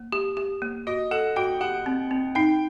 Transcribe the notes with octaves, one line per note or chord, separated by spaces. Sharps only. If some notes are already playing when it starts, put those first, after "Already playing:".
Already playing: A#3
G4
G4
A#3
F#4 D#5
A4 F#5
F#4 G5
G4 F#5
C4
C4
D#4 G5